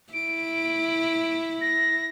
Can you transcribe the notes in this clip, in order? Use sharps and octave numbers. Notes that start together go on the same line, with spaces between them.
E4 D7
A#6